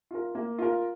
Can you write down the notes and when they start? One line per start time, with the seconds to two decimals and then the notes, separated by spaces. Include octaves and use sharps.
0.11 F4 A#4
0.35 A#3
0.59 F4 A#4